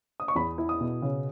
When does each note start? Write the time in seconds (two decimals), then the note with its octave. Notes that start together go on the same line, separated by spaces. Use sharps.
0.20 D#6
0.28 C#6
0.35 E2 B5
0.58 E4
0.69 D#6
0.81 B2
1.02 C#3